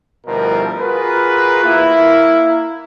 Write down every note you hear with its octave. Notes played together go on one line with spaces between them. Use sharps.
D2 B2 F3 G3 E4 A#4
F4 F#4 G#4 A#4 B4
A#3 E4